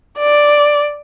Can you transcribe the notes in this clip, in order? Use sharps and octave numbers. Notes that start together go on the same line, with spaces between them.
D5